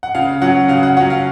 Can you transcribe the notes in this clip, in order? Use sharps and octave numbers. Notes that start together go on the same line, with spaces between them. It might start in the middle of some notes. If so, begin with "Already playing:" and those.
F#5
C#3 F5
F#3 C#4 F#5
C#3 F5
F#5
F#3 C#4 F#5
F5